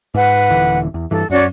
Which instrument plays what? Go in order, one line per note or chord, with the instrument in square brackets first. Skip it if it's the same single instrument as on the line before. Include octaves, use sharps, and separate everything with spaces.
[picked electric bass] G#2 [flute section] B4 F#5
[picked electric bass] D#1 D3 E3
E2
[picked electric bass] G2 E3 [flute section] A4
[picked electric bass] F#2 [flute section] C#4 F#4 D5